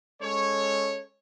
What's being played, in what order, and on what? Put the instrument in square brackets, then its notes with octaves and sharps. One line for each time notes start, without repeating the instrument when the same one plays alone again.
[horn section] G#3 C#4 A4 C#5